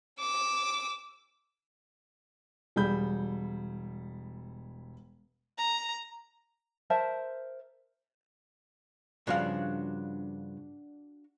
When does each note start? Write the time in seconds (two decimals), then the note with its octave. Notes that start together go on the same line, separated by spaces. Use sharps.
0.20 D6 E6
2.76 E1 G3 G#4 B5 G6
5.58 A#5
6.90 A#4 C5 E5 A5
9.27 G2 C#3 F3 D4 F#4 F5